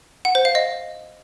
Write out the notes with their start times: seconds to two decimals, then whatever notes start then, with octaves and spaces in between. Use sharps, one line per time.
0.25 F#5
0.35 C5
0.45 F5
0.55 D#5